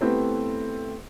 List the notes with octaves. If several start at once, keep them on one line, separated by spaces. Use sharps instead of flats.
A3 B3 C4 E4 G4 B4